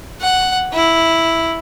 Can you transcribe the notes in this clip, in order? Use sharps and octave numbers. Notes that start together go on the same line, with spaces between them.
F#5
E4